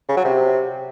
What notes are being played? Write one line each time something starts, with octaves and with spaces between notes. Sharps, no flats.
C#3
F#3
C3